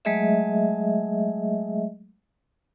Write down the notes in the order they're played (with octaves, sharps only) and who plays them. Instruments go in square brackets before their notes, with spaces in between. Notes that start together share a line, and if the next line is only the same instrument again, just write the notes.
[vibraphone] F#3 G#3 A3 G#4 D#5 E5